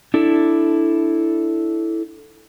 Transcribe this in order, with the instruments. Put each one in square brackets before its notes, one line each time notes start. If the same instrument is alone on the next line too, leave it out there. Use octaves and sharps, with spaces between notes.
[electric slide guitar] D4 E4 A4